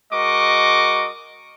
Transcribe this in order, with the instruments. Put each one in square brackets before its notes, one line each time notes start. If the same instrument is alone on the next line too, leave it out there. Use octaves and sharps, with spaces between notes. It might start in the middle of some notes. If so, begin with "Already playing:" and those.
[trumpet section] G#3 F#4 A#4 D#5 C#6 D6